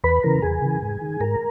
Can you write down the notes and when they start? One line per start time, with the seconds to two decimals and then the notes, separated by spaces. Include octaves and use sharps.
0.04 E2 B4 B5
0.23 C#3 E3 A#4 A#5
0.42 E2 G#4 G#5
0.62 C#3 E3
0.82 G#2
1.01 D#3
1.20 G#2 A#4 A#5